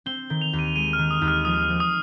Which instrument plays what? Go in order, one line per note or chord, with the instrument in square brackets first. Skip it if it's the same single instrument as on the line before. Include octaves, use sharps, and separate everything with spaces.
[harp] C4 [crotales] G7
[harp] D#3
[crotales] F7
[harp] D#2
[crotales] D#7
[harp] G#3 [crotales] D#7
[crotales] F6
[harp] D#3
[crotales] D#6
[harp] D#2
[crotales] F6
[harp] F3 [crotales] D#6
[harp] F3
[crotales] D#6